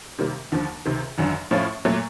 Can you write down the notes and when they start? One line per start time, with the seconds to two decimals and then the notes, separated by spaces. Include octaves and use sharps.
0.18 C3 D#3 G3 A#3
0.52 D#2 D3 F3
0.86 C#2 C3 D#3
1.18 G#1 F#2 D3
1.51 A2 F3 A3 C#4 F4
1.85 A#2 F#3 A3